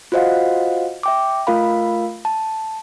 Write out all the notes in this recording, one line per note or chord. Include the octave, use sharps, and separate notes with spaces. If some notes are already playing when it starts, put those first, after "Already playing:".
F4 F#4 C5 D#5 F5 F#5
E5 G5 D6
A3 F4 A#4 F5 B5
A5